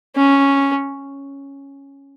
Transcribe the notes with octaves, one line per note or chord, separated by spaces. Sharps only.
C#4